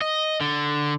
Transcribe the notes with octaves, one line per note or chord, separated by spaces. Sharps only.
D#5
D3